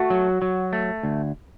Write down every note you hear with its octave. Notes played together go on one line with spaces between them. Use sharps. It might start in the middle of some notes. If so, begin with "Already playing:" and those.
Already playing: A3 F#4
F#3
F#3
A3
D2